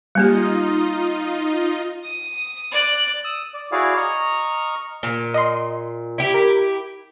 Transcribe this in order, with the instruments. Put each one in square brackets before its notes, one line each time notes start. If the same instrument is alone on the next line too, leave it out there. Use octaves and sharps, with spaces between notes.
[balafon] G3 A#3 G4 [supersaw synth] D#4 F4 D#5
[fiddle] D#6
D5 F#6
[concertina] D#6 E6
D5
E4 F#4 G#4 C#5 D5 F5
D#5 A#5 C#6 F6
[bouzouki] A#2
[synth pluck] D#5 C6
[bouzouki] E4 G4
[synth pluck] A#4